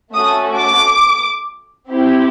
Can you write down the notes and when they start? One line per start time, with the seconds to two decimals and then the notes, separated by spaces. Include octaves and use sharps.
0.13 A3 C#4 F#4 A4 D#6
0.57 D6
1.89 C4 E4 G4